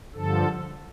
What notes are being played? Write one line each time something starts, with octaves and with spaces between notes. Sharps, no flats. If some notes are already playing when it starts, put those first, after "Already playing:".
G2 D3 F3 A4